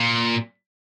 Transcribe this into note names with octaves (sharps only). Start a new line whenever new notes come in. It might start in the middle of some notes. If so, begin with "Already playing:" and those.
Already playing: A#2